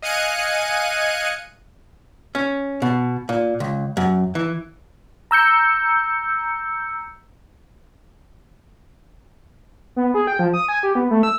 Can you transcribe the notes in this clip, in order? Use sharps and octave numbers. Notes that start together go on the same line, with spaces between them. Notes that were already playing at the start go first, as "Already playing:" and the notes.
D#5 F5 G#5 F#6 C#7 D#7
C#4
B2
A#2
C#2
F#2
E3
A#5 E6 G6 C#7
B3
G#4
G5
F3
D#6
G#5
G4
B3
A3
E6